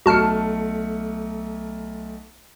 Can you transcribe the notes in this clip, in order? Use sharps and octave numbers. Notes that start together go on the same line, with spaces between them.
B1 A3 F#4 A5 F6 C#7